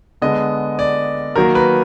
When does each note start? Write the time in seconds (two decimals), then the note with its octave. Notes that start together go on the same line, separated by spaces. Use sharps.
0.21 D3 G#3 B3 D#5
0.79 D5
1.36 D#3 F#3 A#3 A#4
1.55 B4